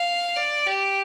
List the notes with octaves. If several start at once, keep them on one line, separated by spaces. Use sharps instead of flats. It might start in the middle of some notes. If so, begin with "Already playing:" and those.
Already playing: F5
D5
G4